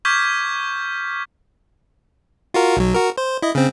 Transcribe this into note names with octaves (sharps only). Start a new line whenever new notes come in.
C#6 D6 F6 G6 G#6 B6
F4 F#4 A#4
B1 F#3
F#4 A#4
C5
E4 D#5
C#3 C4